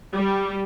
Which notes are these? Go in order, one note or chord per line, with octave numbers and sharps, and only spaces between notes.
G3